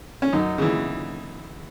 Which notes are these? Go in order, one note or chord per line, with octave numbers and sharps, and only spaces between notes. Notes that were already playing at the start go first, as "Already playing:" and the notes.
C#4
F#2 D#4
C#3 E3